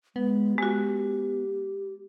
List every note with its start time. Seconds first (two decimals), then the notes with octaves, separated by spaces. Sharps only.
0.16 G#3 B3
0.58 G#3 F#4 G4